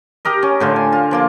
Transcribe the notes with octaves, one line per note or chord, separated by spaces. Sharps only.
D#4 G4 A#4 D#5
C#4
A2 D3 F4
G#5
F4
F3 A#3 F4